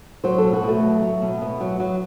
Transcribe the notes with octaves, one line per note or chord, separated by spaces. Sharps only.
F#3 C5
B2 A4
F#4
B2 A3
F#3
F#3
B2
B2 B3
F#3
F#3